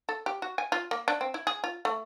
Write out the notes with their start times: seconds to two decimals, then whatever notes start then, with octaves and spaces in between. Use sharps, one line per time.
0.09 A4
0.26 G4
0.42 F#4
0.58 G#5
0.72 F4
0.91 A#3
1.08 D4
1.21 C4
1.34 E4
1.47 G#4
1.64 F4
1.85 A3